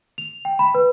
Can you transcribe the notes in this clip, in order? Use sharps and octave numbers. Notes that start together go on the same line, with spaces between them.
F7
G5
B5
B4